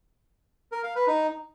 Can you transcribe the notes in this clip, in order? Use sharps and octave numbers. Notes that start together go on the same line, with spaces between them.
A#4
F5
B4
D#4